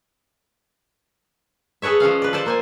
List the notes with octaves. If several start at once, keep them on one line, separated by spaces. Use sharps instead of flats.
G#4 A4 B4 C#5 E5
F3 G#3 C#4 F5
B4 D5
A4 C5 D5 A5
A#3 C5 G#5